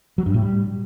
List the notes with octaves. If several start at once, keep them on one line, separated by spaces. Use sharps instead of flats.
F#3
G2
A2
G3